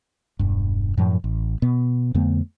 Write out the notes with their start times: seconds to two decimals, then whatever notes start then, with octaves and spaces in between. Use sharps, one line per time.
0.39 E1 G2
0.97 F#2 A2 F3
1.24 A1
1.62 B2 B3
2.14 F2 D3 A3 B3